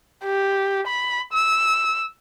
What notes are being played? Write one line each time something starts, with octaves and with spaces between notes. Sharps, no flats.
G4
B5
E6